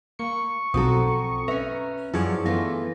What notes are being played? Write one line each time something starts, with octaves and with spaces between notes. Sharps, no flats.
A#3 C#6 C#7
B1 F3 C4 F#4 A4 A#5 D#6
C#4 B4 E5 A#5
F#2 F3 D4 E4 G#4 A4 C#5 D5
E3 A3 B3 F4 A#6